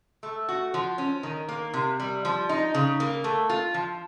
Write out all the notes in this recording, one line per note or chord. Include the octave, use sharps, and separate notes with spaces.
A3
F#4
F3
C#4
D#3
A#3
C3
G3
F3
D#4
C#3
A#3
A3
F4
F3